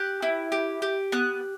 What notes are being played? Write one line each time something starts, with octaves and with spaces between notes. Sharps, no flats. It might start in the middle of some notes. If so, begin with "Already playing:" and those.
Already playing: G4 F#6
E4
G4
G4
B3 F#6